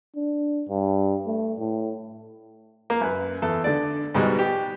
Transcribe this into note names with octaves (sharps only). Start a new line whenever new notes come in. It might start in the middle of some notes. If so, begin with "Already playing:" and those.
D4
G2
A3
A2
A#3
F#2 B4
E2 A4
D3 D5
G#2 B2 G3 G#3
G4